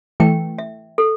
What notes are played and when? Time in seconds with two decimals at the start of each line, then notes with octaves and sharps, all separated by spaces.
0.20 E3 A3 G5
0.58 E5
0.98 A4